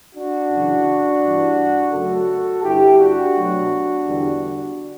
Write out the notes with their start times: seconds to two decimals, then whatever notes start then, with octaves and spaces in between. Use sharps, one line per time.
0.15 D4 F#4
0.50 F#2 C#3 E3
1.21 G2 E3 G3
1.92 F#2 C#3 F#3 A3 F#4 A4
2.63 G2 D3 G3 E4 G4
2.98 D4 F#4
3.34 B2 F#3 A3
4.05 E2 D3 G3